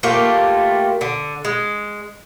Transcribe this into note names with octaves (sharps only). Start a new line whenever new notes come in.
A3 A#3 F4 G4
D3
G#3